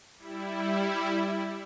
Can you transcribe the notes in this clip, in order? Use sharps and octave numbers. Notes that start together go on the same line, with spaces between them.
G3 E4